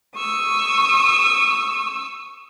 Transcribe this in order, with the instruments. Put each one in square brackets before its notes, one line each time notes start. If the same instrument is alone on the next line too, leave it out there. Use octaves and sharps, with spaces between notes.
[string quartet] C#6 D#6 E6